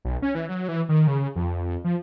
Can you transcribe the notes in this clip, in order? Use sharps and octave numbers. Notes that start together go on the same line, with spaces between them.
B1
C#4
E3
F#3
E3
D#3
C#3
F2
F3